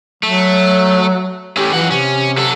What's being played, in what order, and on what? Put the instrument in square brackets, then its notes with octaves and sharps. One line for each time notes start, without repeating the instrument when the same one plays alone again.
[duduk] F#3 [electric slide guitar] A3
[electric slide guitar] E3 A3 C#4 [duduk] G4
[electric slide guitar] F#2 F3 F#5 [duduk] E3
[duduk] C3 [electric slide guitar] C#4
[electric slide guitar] F#3 A4